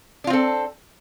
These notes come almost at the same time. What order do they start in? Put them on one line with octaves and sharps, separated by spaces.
D4 F4 C4 A4